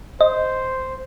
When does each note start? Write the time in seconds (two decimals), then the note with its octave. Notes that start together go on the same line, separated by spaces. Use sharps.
0.21 C5 D#5